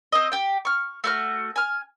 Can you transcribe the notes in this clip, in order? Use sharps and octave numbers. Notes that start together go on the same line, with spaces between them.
C4 D#5
G4 G5
C#6 F6
A3 F#4 F6
G#5 F6